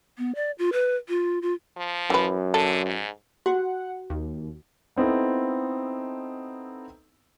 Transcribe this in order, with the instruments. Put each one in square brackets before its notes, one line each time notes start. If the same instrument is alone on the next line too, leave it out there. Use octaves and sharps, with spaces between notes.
[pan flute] B3
D5
F4
B4
F4
F4
[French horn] F3
[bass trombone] F#2 [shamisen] E3 B4
[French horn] D3 [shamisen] A4
[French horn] G#2
[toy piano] F#4 [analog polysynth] F#5
[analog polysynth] D#2
[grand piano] B3 C4 D#4 E4 A4